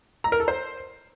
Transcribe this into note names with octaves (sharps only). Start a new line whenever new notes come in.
A#5
A#4
A4
C5